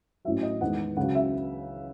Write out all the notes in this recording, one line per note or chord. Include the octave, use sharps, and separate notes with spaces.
A1 A2 F#3 E5
D#5
E2 D#3 G#3 F#5
C#2 C#3 F#3 F#5
E5